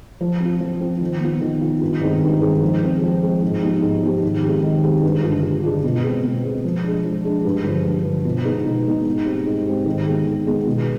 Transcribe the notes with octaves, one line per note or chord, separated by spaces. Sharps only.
F3
C4 F4
F3
C4 F4
D#3
B3 F4
D#3
B3 F4
G2
D#3 G#3 C4 D#4
G2
D#3 G#3 C4 D#4
F3
G#3 C4
F3
G#3 C4
G#2
F3 B3 D#4 G4
G#2
F3 B3 D#4 G4
D#3
G#3 C4 G4
D#3
G#3 C4 G4
G2
D3 G#3 D4 F4
G2
D3 G#3 D4 F4
B2
G#3 C4
B2
G#3 C4
F3
G#3 D4
F3
G#3 D4
G2
D3 F3
G2
D3 F3
B2
G#3 B3 D#4
B2
G#3 B3 D#4
G#2
G3 C4
G#2
G3 C4
D#3
G#3 B3
D#3
G#3 B3
B2